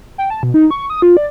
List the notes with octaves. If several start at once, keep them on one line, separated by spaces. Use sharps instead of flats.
G5
A5
B2
D#4
C#6
D#6
F4
D5